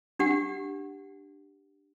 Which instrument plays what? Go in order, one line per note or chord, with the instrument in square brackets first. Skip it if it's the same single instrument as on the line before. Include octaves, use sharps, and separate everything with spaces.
[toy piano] D4 G4 F#5